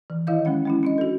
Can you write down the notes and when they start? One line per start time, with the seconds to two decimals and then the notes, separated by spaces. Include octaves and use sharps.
0.10 E3
0.27 D#3 E4 D#5 F5 G6
0.45 F3 G#3 C#4 F#5
0.65 G#3 C#4 E4
0.83 C#4 D4 D#5
0.98 F#4 A4